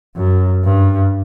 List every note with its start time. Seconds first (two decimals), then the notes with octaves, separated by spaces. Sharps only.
0.17 F#2
0.64 G2